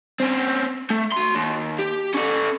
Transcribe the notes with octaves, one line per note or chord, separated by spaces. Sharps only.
C4 C#4
A3
F#4 C6
D#2
G4
C#4 A4